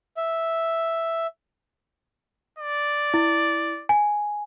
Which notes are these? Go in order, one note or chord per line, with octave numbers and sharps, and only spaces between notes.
E5
D5
E4
G#5